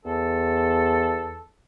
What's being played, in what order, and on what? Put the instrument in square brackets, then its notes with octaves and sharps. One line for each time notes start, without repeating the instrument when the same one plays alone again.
[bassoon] E2 [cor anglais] A4